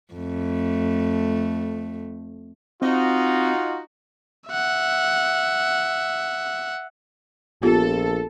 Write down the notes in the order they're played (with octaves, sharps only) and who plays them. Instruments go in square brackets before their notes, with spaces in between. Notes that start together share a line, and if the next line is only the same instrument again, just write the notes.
[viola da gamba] F2 A3
[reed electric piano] C4 [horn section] D#4 F#4 [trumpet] F4
[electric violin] E5 F#5
[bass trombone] A#1 [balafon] B3 F4 G4 [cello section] A4